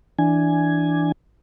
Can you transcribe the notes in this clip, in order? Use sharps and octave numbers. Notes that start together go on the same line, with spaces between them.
E3 D4 G#5